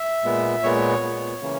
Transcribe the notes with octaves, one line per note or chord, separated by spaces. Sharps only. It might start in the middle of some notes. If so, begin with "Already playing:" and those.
Already playing: E5
A#2 G#3 B3
A#2 G#3 B3 C#5
A#2 G#3 B3
C#3 E3 A#3 C#4